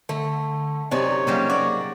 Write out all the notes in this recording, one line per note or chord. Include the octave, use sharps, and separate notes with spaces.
D3 A3
F#2 C3 D#4 C#5 D5
C#3 F#3 G3 A#3
F#4 D5